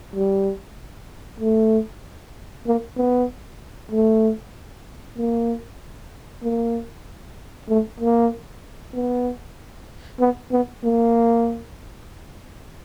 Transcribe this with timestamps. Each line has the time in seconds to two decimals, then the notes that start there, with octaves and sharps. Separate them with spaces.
0.15 G3
1.40 A3
2.67 A#3
2.97 B3
3.92 A3
5.18 A#3
6.43 A#3
7.69 A3
8.00 A#3
8.94 B3
10.20 B3
10.51 B3
10.84 A#3